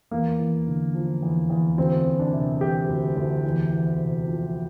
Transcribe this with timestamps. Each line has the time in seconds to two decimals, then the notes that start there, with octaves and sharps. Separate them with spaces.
0.11 E2 A#3
0.39 E2
0.67 D3
0.95 F3
1.22 E2
1.50 E2
1.78 D2 C4
2.05 D2
2.19 D4
2.33 C3
2.61 E3 G4
2.88 D2
3.16 D2
3.44 E2
3.72 E2
3.99 C3
4.27 F3